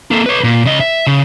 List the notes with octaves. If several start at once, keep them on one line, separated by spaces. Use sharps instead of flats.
A#3 A4
B4 C#5
A#2
C#3 D#5
E5
C#3